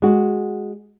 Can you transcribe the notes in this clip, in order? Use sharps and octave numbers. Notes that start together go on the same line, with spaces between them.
G#3 F#4